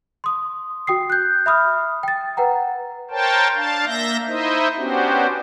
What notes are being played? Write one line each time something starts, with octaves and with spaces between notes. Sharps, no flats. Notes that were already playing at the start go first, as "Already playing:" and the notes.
C6 D#6
F#4 G5 D#6 C7
F#6 G6
E5 B5 D#6 F6
G5 A6
B4 F#5 G5 A#5
A#4 C5 C#5 G5 A5
D4 F5 A5
A#3 E5 G6 A#6
D#4 E4 C5 D#5 E5
B3 C#4 D4 F#4 G4 C5